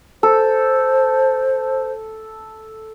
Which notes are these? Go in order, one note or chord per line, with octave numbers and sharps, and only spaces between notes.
A4 C5